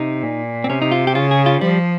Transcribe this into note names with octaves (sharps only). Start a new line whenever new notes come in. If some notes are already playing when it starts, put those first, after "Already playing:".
Already playing: C3 D#4
A#2
C4
C3 C#4
D#4
F4
G4
C#3 F4
G#4
F4
F3 G3